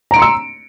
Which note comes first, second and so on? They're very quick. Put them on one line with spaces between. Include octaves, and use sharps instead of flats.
A#5 D7 C6 C#7 E6